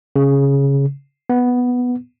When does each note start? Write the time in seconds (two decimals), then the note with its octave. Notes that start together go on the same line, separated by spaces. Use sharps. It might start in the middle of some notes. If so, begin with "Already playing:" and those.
0.16 C#3
1.30 B3